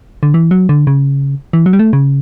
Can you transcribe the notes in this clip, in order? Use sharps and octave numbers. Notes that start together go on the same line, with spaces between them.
D3
E3
F#3
D3
C#3
E3
F#3
G3
A3
C#3